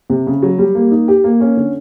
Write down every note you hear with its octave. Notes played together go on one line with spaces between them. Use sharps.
C3
C#3
F#3
G3
A#3
D#4
G4
A#3
C#4
D3